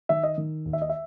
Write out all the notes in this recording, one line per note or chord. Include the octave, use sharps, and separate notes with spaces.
D#3 E5
D#5
D#3
D#2
E5
D#5
E5